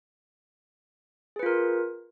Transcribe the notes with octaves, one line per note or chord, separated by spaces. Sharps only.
F4 G#4 A#4 B4